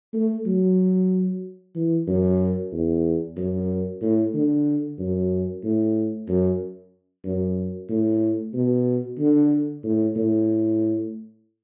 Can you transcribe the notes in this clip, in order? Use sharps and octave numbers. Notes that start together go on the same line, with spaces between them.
A3
F#3
E3
F#2
E2
F#2
A2
D3
F#2
A2
F#2
F#2
A2
B2
D3
A2
A2